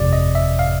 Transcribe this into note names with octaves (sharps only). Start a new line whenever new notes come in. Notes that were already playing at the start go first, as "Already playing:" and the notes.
Already playing: G1 F2 C3 D5
D#5
E5
F5